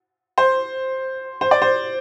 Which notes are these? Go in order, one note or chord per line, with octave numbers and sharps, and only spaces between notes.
C5
C5
D5
C5